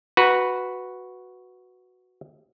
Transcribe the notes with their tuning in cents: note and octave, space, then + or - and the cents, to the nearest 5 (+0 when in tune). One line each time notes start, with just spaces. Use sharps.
F#4 +0 B4 +0 A#5 +35